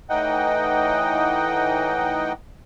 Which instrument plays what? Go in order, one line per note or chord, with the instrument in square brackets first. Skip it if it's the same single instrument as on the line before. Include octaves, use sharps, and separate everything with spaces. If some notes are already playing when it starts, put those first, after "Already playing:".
[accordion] A2 E3 D#4 D#5 F#5 G5